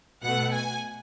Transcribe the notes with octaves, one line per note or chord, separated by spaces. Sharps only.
B2 A3 F#5
G#5